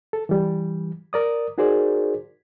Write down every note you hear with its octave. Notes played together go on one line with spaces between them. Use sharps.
A4
E3 G3
A#4 D5 D#6
D#4 F#4 G#4 A#4 C5 D5